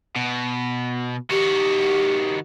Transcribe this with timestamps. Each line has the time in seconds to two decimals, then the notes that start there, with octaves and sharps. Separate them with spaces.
0.16 B2
1.30 D#3 F#4 G4